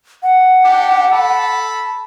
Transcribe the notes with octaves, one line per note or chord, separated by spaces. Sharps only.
F#5
D4 G4
A4 A5 B5